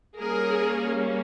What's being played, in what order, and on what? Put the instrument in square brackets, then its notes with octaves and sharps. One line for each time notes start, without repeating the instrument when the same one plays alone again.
[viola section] G3 A#3 C#4 G#4 A#4